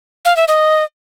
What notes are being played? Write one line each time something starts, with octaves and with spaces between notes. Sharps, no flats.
F5
E5
D#5